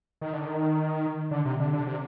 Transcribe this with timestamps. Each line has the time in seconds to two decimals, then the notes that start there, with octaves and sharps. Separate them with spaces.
0.21 D#3
0.33 D3
0.46 D#3
1.31 D3
1.45 C3
1.60 D3
1.73 D3
1.87 C3